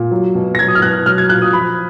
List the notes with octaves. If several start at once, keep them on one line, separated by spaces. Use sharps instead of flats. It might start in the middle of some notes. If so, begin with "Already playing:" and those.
Already playing: A#2
F#3
B2
A#6
F#3 G#6
D#6
F6
B2 F#6
F#3 F6
G#6
A#2 F#6
D#6
F3 B5